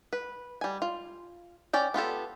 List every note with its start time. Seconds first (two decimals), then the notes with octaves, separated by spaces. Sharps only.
0.13 B4
0.61 G3 G#5
0.82 F4
1.73 C#4 D5 G5
1.94 B3 F4 G4 A4